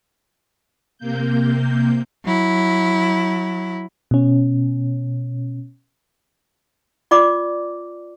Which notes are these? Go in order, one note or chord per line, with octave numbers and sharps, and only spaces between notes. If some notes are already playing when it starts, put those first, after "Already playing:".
C3 A#3 G6
F#3 E4
B2 C#4
F4 D5 D6